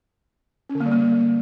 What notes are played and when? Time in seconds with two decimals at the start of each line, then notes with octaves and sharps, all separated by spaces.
0.70 C#4
0.75 D3
0.81 A#3
0.86 G3
0.92 A#3